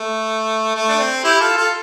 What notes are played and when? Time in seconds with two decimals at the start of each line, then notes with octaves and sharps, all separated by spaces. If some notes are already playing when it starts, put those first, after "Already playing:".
Already playing: A3
0.75 A3
0.89 D4
1.00 C4
1.24 E4 G4
1.40 F4 A4
1.57 F4 A4